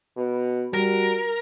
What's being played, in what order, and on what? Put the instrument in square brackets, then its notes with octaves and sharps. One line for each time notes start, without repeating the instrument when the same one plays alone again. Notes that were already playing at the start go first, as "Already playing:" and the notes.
[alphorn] B2
[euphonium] G3 [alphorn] F#4 [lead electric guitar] A#4